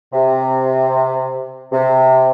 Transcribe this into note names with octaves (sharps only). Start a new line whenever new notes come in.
C3
C3